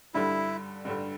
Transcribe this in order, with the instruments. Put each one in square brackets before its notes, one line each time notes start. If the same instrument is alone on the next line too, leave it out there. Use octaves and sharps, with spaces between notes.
[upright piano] G2 D3 G3 [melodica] E4
[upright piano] G2 D3 G3